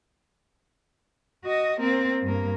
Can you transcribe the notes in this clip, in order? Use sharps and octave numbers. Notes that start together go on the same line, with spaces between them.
F#4 D#5
A#3 C4
G2 A#3